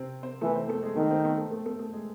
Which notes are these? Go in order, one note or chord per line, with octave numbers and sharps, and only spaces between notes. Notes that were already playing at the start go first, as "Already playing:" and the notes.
Already playing: C3 C4
C4 C5
E3 A3 A4
C4 C5
A3 A4
G#3 G#4
D#3 A3 A4
C4 C5
A3 A4
A3 A4
A3 A4
A3 A4
A3 A4
G#3 G#4